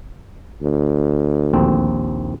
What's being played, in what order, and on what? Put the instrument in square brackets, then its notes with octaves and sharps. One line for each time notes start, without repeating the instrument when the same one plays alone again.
[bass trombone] D2
[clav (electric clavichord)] A#1 D#2 C4